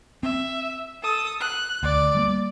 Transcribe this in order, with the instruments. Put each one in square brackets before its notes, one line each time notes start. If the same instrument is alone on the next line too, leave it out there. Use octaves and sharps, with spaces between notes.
[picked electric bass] C4 [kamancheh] E5
[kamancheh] A4 D#6
F#6
[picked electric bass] D2 [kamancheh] D5
[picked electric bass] G3 G#3 A#3